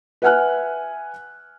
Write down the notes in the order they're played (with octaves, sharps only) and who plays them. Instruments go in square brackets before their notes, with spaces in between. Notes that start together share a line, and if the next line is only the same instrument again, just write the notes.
[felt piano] B4 E5 F#5 G#5 F6 F#6